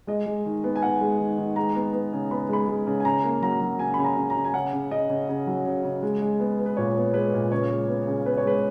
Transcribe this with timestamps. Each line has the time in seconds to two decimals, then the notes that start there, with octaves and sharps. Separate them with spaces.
0.07 G#3 D#5
0.26 G#3
0.45 D#3
0.64 B3
0.76 G#5
0.82 B3 F#5
1.01 G#3
1.20 D#3
1.38 D#3
1.56 G#3 A#5
1.75 B3
1.93 B3
2.13 C#3
2.31 B3 B5
2.49 G#3 B5
2.68 G#3
2.87 C#3
3.00 G#5
3.05 C#3 A#5
3.24 A#3
3.42 F#3 A#5
3.61 F#3
3.79 C#3 G#5
3.94 C#3 B5
4.04 A#5
4.17 C#3
4.30 A#5
4.36 C#3
4.44 G#5
4.54 C#3 F#5
4.73 C#3
4.91 C#3 D#5
5.10 C#3
5.29 C#3
5.47 F#3
5.65 C#3
5.84 C#3
6.03 G#3
6.22 G#3
6.40 B3
6.59 B3
6.66 B4
6.77 A#2 C#5
6.96 B3
7.14 G#3 B4
7.33 A#2
7.52 C#3 C#5
7.70 G#3
7.88 B3
8.07 C#3
8.25 B3 B4
8.37 C#5
8.45 G#3 B4